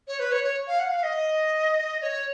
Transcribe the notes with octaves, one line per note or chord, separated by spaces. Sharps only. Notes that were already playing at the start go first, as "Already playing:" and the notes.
C#5
B4
C#5
C#5
F5
F#5
F5
D#5
D#5
C#5